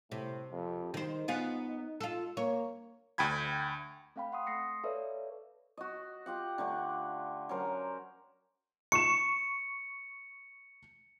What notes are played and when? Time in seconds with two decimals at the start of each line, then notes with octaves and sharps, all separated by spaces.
0.12 A2 C3
0.51 F2
0.94 D#3 D#4 C5
1.28 B3 F4 G#4
2.01 F4 A4
2.37 A#3 C#5
3.18 D2 G5 B5 G#6
4.16 A3 C4 F5 G5 B5
4.32 F#5 C6 D#6
4.47 A3 C6 D#6 A#6 C7 C#7
4.84 A4 B4 C#5 D5 E5 F5
5.77 F#4 D#5
6.26 F4 G4 F#5
6.58 D3 A3 D4
7.49 F#3 C#4 A#4 C5
8.92 C#6 C#7 E7